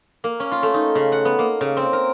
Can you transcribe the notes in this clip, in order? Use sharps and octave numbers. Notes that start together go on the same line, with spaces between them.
A#3
C#4
F4
A3
D#4
C#3
F#5
B3
A#3
C#3
C4
A#4